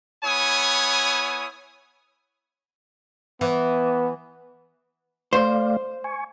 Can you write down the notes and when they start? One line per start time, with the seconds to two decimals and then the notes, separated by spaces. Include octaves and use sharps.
0.24 B3 E4 C#5 G#5 D#6
3.41 E3 B3
5.33 A3 C5 D5 F5
6.04 G#5 C#6